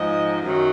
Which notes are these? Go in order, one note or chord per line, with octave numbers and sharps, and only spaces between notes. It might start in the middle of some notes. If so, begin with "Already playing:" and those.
Already playing: G#2 F3 D#5
F#2 D#3 F#3